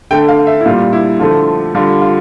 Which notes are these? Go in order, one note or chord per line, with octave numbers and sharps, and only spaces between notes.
D3 A3 G5
F5
E5
E4
A#2 G3 F4
E4
D3 F3 A3 F4
D3 G3 F4
F4